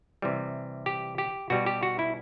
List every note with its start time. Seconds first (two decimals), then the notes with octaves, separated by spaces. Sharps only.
0.22 C3 E3 G3
0.86 G4
1.18 G4
1.50 B2 G3 F#4
1.66 G4
1.83 F#4
1.99 E4